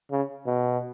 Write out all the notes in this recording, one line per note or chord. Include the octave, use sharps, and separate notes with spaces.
C#3
B2